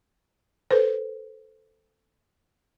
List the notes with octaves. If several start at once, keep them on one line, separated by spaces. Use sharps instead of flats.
A4 B4 C5